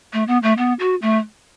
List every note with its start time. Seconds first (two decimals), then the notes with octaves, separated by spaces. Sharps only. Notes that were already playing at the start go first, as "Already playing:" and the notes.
0.13 A3
0.28 B3
0.43 A3
0.58 B3
0.79 F#4
1.02 A3